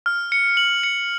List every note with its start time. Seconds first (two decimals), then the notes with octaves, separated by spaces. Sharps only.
0.06 F6
0.32 C#7
0.57 F#7
0.83 C#7